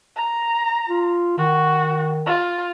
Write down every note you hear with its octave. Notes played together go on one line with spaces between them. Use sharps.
A#5
F4
D#3 F#4
F4